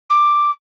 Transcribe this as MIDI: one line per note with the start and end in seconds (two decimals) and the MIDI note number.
0.10 0.51 86